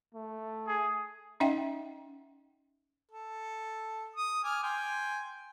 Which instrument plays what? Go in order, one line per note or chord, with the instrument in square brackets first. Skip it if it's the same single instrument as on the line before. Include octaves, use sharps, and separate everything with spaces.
[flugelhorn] A3
[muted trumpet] G#4
[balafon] C#4 D#4 D#5 E5 F#5 G5
[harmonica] A4
D#6
G#5 D6 F6
G5 G#5 C6